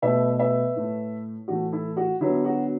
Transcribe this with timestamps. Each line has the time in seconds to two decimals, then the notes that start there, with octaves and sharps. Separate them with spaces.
0.02 B2 A3 B4 E5
0.39 B4 E5
0.76 A2 A3
1.48 A2 E3 A3 F#4
1.72 E4 A4
1.97 F#4
2.20 D3 F#3 B3 E4
2.45 F#4